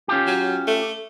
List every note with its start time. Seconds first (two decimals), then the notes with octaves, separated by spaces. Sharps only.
0.08 C#4 F4 G4
0.27 F#3
0.67 A3